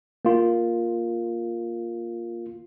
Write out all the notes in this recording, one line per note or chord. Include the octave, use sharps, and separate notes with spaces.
A#3 F4